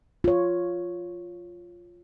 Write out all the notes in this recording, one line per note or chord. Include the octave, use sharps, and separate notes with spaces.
F4 C#5